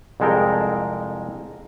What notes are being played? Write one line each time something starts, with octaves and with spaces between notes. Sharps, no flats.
C2 F2 G#3 A4 A#4 G5